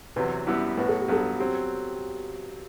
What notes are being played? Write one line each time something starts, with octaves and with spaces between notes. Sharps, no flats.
E2 C3 F#3 B4
F#2 E3 G3 B3 E4
A2 F#3 B3 F#4 B4
A4
G4
G2 F#3 B3 A4
F#3 C4 G4